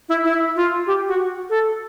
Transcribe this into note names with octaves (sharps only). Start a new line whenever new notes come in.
E4
E4
F4
G4
F#4
A4